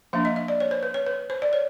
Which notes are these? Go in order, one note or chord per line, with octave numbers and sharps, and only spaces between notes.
F3 A#3 D4 E5
D#5
D#5
D5
C#5
C5
B4
C#5
B4
C5
D5
C#5